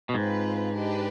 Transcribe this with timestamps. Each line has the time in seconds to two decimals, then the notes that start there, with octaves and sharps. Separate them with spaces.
0.09 B2
0.14 G#2 C4 F4 B4
0.75 D4 G4 B4 D#5